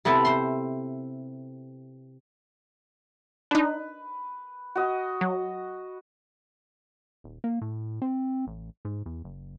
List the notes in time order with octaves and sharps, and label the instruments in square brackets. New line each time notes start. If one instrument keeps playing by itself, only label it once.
[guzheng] C3 B3 E4 A4 B4
C5 C6
[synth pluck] D4 D#4 [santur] B4
[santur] F#4 D#5
[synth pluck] F#3
[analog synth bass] D#1
A#3
A2
C4
A1
G#2
E2
F#1